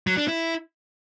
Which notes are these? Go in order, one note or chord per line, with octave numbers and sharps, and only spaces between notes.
F#3
D4
E4